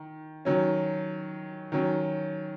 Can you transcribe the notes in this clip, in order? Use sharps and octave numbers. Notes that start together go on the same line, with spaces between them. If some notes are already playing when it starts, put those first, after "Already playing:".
Already playing: D#3
D#3 F#3 C#4
D#3 F#3 C#4